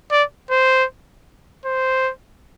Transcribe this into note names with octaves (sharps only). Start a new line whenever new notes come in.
D5
C5
C5